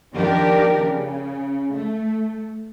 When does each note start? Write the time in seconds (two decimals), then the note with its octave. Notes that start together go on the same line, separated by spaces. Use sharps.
0.13 D#3 F3 A#3 D4 G4 A#4
0.78 C#3
1.72 A3